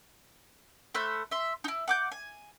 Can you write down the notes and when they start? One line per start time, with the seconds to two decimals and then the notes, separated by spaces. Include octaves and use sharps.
0.95 A3 C5 B5 F#6
1.31 E5 C6
1.64 D#4 E4
1.88 F#5 D6 G6
2.12 G#5